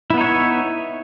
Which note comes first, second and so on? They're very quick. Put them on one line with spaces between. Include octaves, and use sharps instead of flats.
E4 B3 D#4 C#5 E5